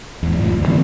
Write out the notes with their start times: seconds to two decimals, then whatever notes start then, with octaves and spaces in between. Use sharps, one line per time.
0.23 E2 G#2
0.34 C#2 F#2 A2 F3
0.51 D2
0.67 D3 E3 A#3 C4